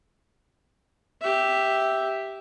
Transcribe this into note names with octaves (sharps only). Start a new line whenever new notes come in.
G4 E5